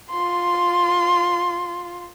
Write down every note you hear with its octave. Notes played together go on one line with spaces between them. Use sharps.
F4 C6